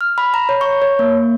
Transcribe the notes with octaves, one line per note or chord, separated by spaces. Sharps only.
F6
B5
A#5
C#5
C#6
C#5
A#3